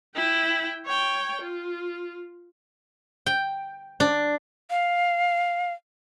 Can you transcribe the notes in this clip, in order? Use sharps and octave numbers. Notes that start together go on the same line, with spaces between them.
E4 G5
C#5 G5
F4
G5
D4
F5